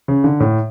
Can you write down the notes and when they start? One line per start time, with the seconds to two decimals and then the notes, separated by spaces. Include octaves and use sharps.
0.08 C#3
0.24 D3
0.40 A2